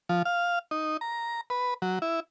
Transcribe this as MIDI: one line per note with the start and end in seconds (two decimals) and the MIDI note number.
0.09 0.22 53
0.25 0.59 77
0.71 0.97 63
1.01 1.41 82
1.50 1.74 71
1.82 1.99 54
2.02 2.20 64